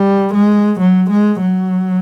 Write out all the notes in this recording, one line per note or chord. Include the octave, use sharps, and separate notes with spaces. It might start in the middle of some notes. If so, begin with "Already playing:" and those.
Already playing: G3
G#3
F#3
G#3
F#3